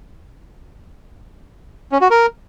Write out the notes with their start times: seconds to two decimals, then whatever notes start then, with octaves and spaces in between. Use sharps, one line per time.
1.92 C#4
2.01 F#4
2.10 A#4